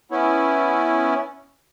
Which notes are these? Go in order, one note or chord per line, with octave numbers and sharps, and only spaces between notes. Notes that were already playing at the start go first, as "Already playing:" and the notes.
B3 C#4 E4